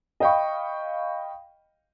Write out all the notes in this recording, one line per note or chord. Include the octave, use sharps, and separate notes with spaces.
D#5 F5 G5 B5 C#6